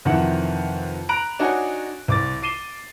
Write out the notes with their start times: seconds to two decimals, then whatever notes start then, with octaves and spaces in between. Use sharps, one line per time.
0.05 F2 C3 D#3 E3 E5 F#5
1.09 A#5 B5 F#6 D7
1.39 D4 D#4 F#4 C#5 F#5 G#5
2.08 C2 D6 A6
2.42 D6 C7 D#7 E7 G7